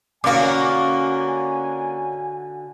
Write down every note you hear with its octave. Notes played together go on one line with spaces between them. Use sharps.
D3 A#3 C#4 F#4 F5 G#5 D6